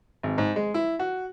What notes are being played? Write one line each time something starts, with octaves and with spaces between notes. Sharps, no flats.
G#1
G#2
G#3
E4
F#4